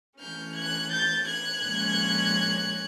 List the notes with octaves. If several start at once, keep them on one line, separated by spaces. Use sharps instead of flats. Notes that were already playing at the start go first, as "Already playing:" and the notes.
E3 A3 C#4 F6 G6
F#6 G#6
G6 A6
F#6 G#6
A#2 F3 G#3 C#4